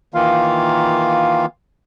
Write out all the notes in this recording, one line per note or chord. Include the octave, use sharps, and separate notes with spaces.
D#3 E3 A#3 F4 F5